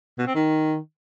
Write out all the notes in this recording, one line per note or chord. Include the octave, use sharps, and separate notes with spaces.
B2
C4
D#3